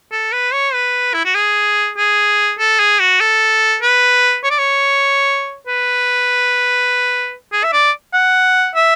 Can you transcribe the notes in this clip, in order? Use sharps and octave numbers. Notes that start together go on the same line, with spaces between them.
A4
B4
C#5
B4
E4
F#4
G#4
G#4
A4
G#4
F#4
A4
B4
C#5
D5
C#5
B4
G#4
E5
D5
F#5
E5